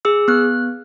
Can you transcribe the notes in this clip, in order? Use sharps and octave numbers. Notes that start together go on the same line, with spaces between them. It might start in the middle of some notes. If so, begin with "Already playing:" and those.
G#4 E6
B3 F#6